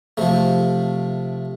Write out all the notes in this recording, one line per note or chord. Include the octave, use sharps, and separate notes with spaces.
C3 F3 A3